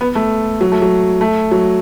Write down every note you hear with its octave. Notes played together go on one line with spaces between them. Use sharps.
B3
A3
F#3
A3
F#3
A3
F#3